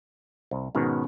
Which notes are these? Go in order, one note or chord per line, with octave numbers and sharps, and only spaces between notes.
C2
G#2 B2 D#3 B3 C#4